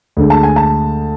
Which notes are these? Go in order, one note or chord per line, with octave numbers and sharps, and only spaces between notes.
D2 D3 G#3
A5
G#5
A5